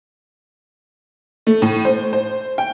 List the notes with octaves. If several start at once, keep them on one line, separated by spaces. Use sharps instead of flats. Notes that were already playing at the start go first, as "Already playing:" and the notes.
A3
A2
C5
C5
G5